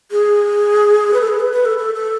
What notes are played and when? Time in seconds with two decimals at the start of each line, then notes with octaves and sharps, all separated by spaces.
0.11 G#4
1.13 B4
1.21 A4
1.27 G#4
1.40 B4
1.52 B4
1.65 A4
1.78 A4
1.94 A4